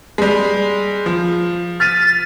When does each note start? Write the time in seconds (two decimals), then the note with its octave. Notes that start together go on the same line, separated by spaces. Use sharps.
0.18 G3 G#3
1.06 F3
1.80 F6 A6 B6 D#7